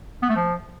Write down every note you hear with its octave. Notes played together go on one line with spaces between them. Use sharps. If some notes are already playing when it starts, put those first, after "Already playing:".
B3
A3
F3